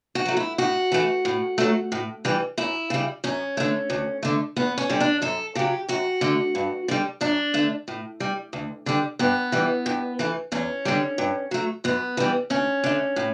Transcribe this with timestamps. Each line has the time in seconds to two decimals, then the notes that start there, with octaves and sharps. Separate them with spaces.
0.15 F#4
0.25 F#3 A3
0.37 E4
0.58 A2 F#4
0.92 E3 A3
1.25 A2
1.58 F#3 A3
1.92 A2
2.25 E3 G3
2.58 F#2 E4
2.90 C#3 G3
3.24 F#2 C#4
3.57 D3 A3
3.90 D2
4.23 D3 A3
4.56 E2 B3
4.78 C#4
4.89 D3 G3
5.00 D4
5.22 F#2 A4
5.55 C#3 F#3 G4
5.89 F#2 F#4
6.21 D3 A3
6.55 G2
6.88 D3 G3
7.21 F#2 D4
7.54 D3 A3
7.88 A2
8.20 G3
8.53 D2
8.86 D3 G3
9.19 G2 B3
9.52 E3 G3
9.86 G2
10.19 E3 A3
10.52 E2 C#4
10.85 D3 G3
11.18 G2
11.51 F#3 A3
11.84 F#2 B3
12.17 E3 G3
12.50 D2 C#4
12.84 D3 A3
13.16 A2